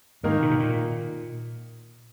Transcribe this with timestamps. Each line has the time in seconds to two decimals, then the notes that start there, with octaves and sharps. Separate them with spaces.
0.24 G#2 D#3 A#3 D#4 A#4
0.42 A#2
0.51 B2
0.60 A#2